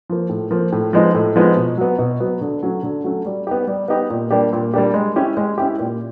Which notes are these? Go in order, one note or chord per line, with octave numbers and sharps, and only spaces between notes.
F3 A#3
A2
F3 A#3
A2
F3 G#3 B3 D#4
A2
F3 G#3 B3 D#4
B2
F#3 B3
B2
F#3 B3
D3
F#3 A3 C#4
D3
F#3 A3 C#4
G3
B3 D#4 G4
G3
B3 D#4 G4
A#2
G3 A#3 D4 G4
A#2
G3 A#3 D4 G4
G#3
C#4 E4 G4
G#3
C#4 E4 G4
A#2